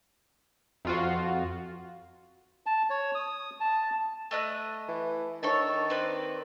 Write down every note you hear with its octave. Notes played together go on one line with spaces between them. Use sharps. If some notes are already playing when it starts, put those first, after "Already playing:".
F2 F4 F#4
A5
C#5
D#6
A5
A3 D#5 F#6
E3
D#3 D4 A4 C#5
C4 B4 D5